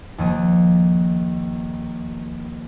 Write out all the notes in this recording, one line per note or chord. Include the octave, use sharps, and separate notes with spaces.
D#2 F3 D#6